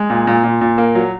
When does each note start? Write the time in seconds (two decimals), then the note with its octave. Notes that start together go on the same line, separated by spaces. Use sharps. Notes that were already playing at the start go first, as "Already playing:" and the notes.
Already playing: G#3
0.10 A#2
0.27 A#2
0.44 A#2
0.61 A#2
0.78 A#3
0.95 F#3